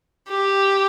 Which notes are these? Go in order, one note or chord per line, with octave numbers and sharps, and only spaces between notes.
G4